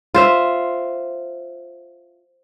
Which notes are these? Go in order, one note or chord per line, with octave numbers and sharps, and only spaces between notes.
F4 C5 E5